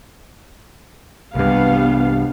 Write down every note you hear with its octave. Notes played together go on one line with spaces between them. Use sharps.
C2 G2 G3 B3 F5